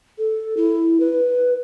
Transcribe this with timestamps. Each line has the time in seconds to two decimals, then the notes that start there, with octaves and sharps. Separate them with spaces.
0.18 A4
0.57 E4
1.00 B4